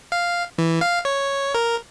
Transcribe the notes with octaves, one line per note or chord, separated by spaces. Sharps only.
F5
E3
F5
C#5
A#4